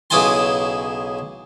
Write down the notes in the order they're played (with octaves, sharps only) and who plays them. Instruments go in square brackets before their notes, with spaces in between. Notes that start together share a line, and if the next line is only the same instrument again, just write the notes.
[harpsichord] B1 C#3 E4 G#5 A5 C6